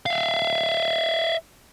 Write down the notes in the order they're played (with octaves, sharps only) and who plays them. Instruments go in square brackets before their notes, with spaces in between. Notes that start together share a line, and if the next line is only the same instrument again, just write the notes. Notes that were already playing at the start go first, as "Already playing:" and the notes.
[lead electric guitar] E5 F5